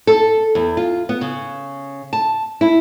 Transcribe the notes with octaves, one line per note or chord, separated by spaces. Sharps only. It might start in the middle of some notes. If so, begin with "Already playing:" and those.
A4
E2
F4
B3
C#3
A5
E4